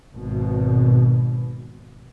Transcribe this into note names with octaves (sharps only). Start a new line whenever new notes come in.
G#1 B2